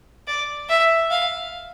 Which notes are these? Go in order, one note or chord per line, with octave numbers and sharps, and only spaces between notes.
D5
E5
F5